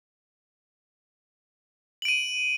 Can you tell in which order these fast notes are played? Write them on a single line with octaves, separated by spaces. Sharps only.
F#7 D7 D#7